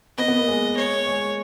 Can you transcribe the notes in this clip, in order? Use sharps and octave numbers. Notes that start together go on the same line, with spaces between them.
B3 D#5
B3
A#3
G#3
C#5
G#3